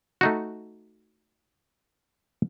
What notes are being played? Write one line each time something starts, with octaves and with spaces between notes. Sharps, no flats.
A3 D#4 F#4